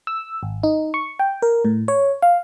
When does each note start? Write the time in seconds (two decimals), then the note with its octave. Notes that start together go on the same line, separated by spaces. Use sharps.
0.07 E6
0.43 G#1
0.63 D#4
0.94 C#6
1.19 G5
1.42 A#4
1.65 A2
1.88 C#5
2.22 F5